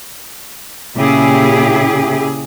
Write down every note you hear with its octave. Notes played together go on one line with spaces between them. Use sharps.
A#2 C#3 E4 G4 G#4